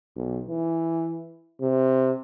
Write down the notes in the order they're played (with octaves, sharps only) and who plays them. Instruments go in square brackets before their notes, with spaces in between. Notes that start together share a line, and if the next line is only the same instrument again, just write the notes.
[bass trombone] B1
E3
C3